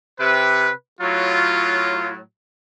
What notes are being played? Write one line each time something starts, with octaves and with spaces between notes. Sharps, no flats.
C3 B4
A2 F#3 F4